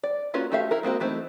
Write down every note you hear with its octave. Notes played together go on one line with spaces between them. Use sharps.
D5
A#3 C#4 F4 F#4 B4
A3 F#4 G4 E5 F5
E4 A#4
G#3 A#3 C4 F#4
E3 A3 C4 D#4